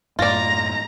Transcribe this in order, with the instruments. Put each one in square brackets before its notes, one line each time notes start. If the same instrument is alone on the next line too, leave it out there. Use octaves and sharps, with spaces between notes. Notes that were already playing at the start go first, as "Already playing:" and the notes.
[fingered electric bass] F#2 A2 A3 [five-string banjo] F4 D5 [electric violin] A#5 A#6